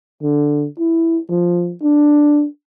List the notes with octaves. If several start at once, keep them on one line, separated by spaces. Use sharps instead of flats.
D3
E4
F3
D4